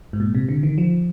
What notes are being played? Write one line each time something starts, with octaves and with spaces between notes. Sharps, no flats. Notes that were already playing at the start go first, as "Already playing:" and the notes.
G#2
A#2
C3
D3
D#3
F3